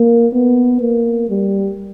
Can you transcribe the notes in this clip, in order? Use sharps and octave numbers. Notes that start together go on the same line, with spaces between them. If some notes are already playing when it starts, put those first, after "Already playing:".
Already playing: A#3
B3
A#3
G3